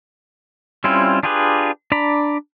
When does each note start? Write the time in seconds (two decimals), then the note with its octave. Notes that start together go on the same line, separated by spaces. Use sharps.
0.84 G3 C4 C#4 E4 F4
1.23 D4 F4 G4 G#4 B4
1.92 D4 D5 A#5 B5